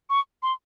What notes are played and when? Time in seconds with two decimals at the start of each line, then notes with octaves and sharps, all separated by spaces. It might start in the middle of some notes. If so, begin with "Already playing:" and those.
0.10 C#6
0.43 C6